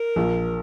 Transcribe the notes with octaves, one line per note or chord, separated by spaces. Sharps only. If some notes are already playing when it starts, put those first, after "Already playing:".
Already playing: A#4
A#1